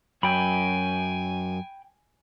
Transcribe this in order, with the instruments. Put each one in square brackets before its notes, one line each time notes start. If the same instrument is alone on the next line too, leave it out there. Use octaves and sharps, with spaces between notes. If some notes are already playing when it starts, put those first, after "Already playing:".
[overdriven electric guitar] F#2 [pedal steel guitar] G5 B5 [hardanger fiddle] G#5